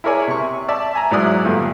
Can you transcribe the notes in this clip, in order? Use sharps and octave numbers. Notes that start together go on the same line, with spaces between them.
E4 G#4 A#4 C#5 D5 G#5
C3 C#6
D5 E5 A5
E5 G#5 A#5
G#2 F#3 E4 D5 D#6 F6
G2 A#2 D3